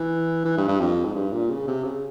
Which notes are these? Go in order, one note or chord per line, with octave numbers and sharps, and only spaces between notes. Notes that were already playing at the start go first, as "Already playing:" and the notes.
Already playing: E3
E3
G2
G2
F2
G#2
G2
A#2
C#3
C3
C#3